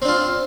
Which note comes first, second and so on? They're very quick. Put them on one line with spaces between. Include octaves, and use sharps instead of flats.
C4 D4 F4